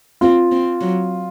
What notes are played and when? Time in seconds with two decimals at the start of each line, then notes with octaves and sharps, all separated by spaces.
0.21 C4 F4
0.52 C4
0.81 F#3